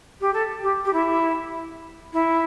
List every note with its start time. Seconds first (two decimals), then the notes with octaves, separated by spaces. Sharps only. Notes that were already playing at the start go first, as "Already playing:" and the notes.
0.20 G4
0.33 A4
0.63 G4
0.85 G4
0.93 E4
2.13 E4